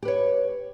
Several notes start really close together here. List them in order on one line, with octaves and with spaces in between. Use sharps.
G4 B4 C#5